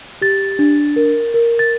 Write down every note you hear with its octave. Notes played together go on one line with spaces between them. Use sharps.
G4 A6
D4
A#4
A#4
A6